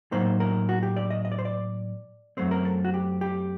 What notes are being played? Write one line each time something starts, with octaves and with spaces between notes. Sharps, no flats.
A2 F#3 A#3 D#4 C5
A#4
F#4
G4
D5
D#5
D#5
D5
C5
D5
F#2 F#3 A3 C4 C5
A#4
A4
F#4
G4
G4